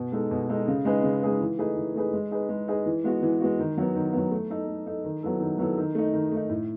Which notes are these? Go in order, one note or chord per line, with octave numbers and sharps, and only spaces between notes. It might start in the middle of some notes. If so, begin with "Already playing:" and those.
Already playing: B2
G#3 D#4 A4
B2
G#3 D#4 A4
C#3
G#3 D#4 G#4 B4
C#3
G#3 D#4 G#4 B4
E3
A3 D#4 G#4 B4
E3
A3 D#4 G#4 B4
G#3
D#4 G#4 B4
G#3
D#4 G#4 B4
E3
G#3 B3 F#4
E3
G#3 B3 F#4
D#3
F#3 B3
D#3
F#3 B3
A3
D#4 A4
A3
D#4 A4
D#3
F#3 B3 E4 A4
D#3
F#3 B3 E4 A4
D#3
A3 D#4
D#3
A3 D#4
A2